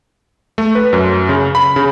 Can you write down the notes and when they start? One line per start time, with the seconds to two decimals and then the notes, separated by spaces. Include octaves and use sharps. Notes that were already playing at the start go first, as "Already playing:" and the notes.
0.58 A3
0.75 B4
0.93 F#2
1.29 C#3
1.55 B5
1.76 C#3